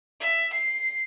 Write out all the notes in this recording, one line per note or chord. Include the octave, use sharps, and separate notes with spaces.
E5
C7